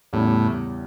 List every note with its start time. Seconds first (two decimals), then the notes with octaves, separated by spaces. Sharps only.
0.13 E2 A2 C#3 G3